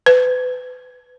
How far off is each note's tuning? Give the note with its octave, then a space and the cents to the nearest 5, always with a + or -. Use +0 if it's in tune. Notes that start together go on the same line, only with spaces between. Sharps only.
B4 +30